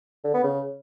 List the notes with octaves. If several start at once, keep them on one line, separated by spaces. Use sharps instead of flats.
D3
B3
C#3